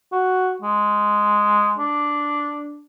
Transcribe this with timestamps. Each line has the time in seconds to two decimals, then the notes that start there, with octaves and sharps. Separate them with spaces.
0.12 F#4
0.62 G#3
1.78 D4